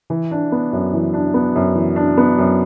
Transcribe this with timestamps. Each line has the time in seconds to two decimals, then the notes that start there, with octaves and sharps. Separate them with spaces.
0.10 E3
0.31 D4
0.52 B3
0.73 F#2
0.93 E3
1.14 D4
1.34 B3
1.55 F#2
1.75 E3
1.96 D4
2.18 B3
2.38 F#2